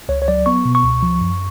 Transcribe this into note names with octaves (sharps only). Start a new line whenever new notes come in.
C#2 C#5
C#5
F#3 D5
B3 C#6
B2
C#6
C#2
F3
F#2